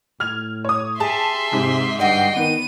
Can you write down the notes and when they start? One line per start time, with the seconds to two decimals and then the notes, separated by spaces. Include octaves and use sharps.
0.20 A2 F6 G#6 F7
0.65 C#5 D#6
1.00 G4 G#4 E5 A5 C6
1.53 G#2 C3
2.00 G2 D3 F#4 D#5 G5 C7
2.36 D#3 B3 D#7